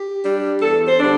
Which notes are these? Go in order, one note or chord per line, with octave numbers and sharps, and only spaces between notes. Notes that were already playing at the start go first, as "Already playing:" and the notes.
Already playing: G4
G3 D4
E2 A4
C5
D3 G3 D4